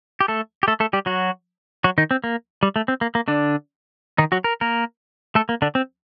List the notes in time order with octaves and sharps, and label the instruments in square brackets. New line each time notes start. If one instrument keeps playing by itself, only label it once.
[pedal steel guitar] G4
A3 A4
G4
A3 A4
A3 A4
G3 G4
F#3 F#4
F#3 F#4
D#3 D#4
C4
A#3
G3
A3
C4
A#3
A#3
D3 D4
D#3 D#4
F#3 F#4
A#4
A#3 A#4
A3 A4
A#3
D3 D4
C4